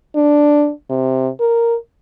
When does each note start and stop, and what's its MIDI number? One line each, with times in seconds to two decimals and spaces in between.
0.15 0.71 62
0.90 1.29 48
1.40 1.76 70